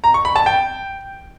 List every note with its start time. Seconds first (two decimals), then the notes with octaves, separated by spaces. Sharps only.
0.04 A#5
0.14 C#6
0.25 B5
0.36 A5
0.46 G5